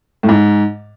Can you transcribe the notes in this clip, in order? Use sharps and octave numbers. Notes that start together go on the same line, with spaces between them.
A2
G#2